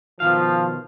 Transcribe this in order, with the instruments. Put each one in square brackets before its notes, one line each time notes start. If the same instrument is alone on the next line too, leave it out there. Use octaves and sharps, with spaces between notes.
[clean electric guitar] B2 D#3 F5 [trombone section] F3